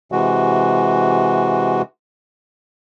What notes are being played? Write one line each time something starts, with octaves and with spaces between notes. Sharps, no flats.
C3 E3 G#3 F#4